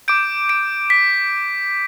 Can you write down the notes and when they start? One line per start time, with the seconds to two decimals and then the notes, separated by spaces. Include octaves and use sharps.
0.08 D6 G6 D7
0.49 D7
0.90 B6